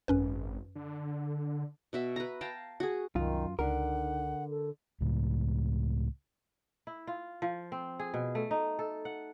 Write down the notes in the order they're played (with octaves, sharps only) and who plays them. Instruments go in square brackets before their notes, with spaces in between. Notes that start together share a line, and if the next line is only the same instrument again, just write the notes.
[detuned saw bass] G#1 [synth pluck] F#2 C#4 B4
[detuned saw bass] D3
[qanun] B2 F#4 E5
B4 A#5
F5 G5 A5 A#5
F#4 G#4
[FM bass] C2 [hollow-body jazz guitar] F#2 F4 [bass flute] D#3
[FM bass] C#2 [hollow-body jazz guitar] D3 A#4 [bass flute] D#4 [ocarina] F#5
[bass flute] A4
[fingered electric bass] C#2 A2
[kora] E4
F4
F3
C4
G#4
B2
A3
D#4
A4
F#5